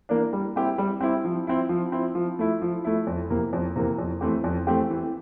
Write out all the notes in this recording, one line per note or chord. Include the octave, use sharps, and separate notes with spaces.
E3 A#3 D4
G3
C4 E4 G4
G3
C4 E4 G4
F3
C4 E4
F3
C4 E4
F3
A3 E4
F3
A3 E4
F2
C3 E3 A#3
F2
C3 E3 A#3
F2
E3 A3 C4 G4
F2
E3 A3 C4 G4
E3